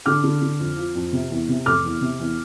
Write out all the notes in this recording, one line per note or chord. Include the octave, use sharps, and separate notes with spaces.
D3 D6 F6
D3
D3
F2
F3
F2
C3
E2
C3
F1 D6 F6
E2
C3
E2